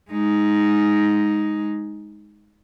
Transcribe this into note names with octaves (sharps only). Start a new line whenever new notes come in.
G#3 D#4